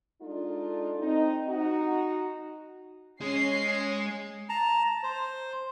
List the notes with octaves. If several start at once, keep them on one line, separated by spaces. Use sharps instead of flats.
G#3 D4 D#4 F4 A4
C4 D#4
D#4 F#4
G#3 C#4 G#4 C7
A5 A#5
C5